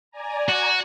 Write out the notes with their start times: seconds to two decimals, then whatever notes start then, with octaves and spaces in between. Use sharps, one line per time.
0.11 D5 G#5 A#5
0.49 F#4